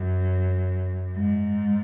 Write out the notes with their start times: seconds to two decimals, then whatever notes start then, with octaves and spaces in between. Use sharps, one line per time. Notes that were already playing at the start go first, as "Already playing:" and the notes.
Already playing: F#2
1.17 G#2